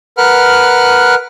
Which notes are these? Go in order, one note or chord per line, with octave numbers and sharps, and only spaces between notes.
A#4 B4 F#5 F6 F#6